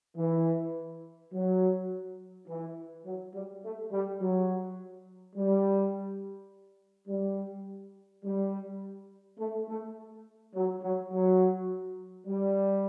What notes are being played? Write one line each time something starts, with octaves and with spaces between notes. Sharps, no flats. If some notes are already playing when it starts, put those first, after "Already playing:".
E3
F#3
E3
F#3
G3
A3
G3
F#3
G3
G3
G3
A3
A3
F#3
F#3
F#3
G3